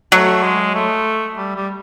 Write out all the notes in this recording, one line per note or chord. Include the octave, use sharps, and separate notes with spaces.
F#3 A3
G#3
A3
G3
G3